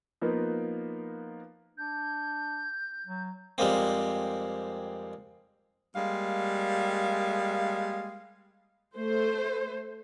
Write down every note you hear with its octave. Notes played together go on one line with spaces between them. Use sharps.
F3 A#3 B3 D#4 A#4 B4
D4 G6
F#3
F2 G3 G#3 A#3 C4
G3 G#3 A#3 F5
A3 C5